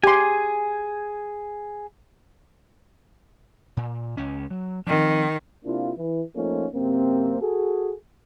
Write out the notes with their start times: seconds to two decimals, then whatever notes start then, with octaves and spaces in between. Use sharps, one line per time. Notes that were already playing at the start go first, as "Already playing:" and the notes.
0.04 G4 G#4 G#5 C6
3.77 A#2
4.17 C#2 C#4
4.50 F#3
4.87 D#3 F3 C4
5.65 C3 A#3 D4 E4 F4
5.96 E3
6.34 F3 A3 A#3 C#4 D#4 F4
6.74 F#2 C3 A#3 C4
7.42 F#4 G#4 A4